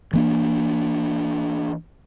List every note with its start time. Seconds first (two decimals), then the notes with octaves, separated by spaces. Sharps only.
0.13 E3 A#3 D4